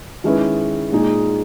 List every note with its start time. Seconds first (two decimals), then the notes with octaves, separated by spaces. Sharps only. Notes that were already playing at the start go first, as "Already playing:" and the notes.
0.24 D#3 G#3 C#4 E4 B4
0.92 A#2 G#3 D#4 G#4